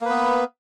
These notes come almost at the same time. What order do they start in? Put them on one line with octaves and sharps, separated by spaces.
A#3 B4 B3